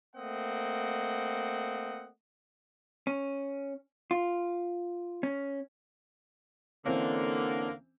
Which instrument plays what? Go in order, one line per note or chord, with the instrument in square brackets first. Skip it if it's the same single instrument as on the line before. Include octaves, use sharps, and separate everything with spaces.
[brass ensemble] A3 A#3 C4 D#5 F#5
[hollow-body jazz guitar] C#4
F4
C#4
[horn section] D3 A#3 [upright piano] E3 C4 C#4